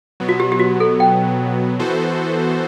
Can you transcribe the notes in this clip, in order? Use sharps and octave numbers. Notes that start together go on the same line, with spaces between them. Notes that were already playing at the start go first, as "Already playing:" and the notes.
B2 F#3 B3
F#4
G4
G4
F#4
A4
G5
E3 B3 F#4 A4 C5